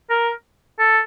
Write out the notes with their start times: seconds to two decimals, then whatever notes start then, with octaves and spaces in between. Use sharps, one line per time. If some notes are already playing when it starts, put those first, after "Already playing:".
0.10 A#4
0.79 A4